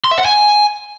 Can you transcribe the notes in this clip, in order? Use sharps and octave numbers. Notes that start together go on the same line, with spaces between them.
C6
E5
F#5
G#5